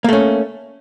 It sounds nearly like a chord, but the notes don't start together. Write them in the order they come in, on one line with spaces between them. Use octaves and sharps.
A#3 A3 C#4